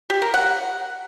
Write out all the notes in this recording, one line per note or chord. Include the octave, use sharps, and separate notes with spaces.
G4
A#4
F#5